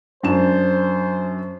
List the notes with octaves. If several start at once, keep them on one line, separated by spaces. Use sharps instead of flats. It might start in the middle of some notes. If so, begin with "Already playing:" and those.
F#2 D4 C5 E7